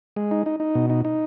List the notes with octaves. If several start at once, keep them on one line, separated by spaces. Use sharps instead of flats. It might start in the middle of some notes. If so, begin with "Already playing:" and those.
G#3
D#4
D#4
D#4
B2
D#4
D#4